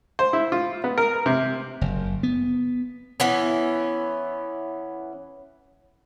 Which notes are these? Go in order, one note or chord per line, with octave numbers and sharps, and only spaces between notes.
C5
E4
F4
B3
A#4
C3
F#1
B3
E3 B3 C#4